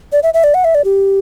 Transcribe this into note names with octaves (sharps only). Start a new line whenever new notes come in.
D5
E5
E5
D5
F#5
E5
D5
G4